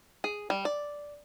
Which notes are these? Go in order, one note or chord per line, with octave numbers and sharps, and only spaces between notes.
G#4
G3
D5